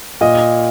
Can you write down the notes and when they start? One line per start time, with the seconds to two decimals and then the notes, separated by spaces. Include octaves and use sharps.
0.21 A#2 D#5